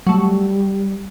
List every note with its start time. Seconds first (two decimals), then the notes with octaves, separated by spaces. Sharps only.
0.07 F#3 G3 A3